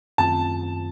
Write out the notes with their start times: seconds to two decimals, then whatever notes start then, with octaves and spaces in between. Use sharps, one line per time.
0.18 F#2 D#3 A3 C4 F4 A5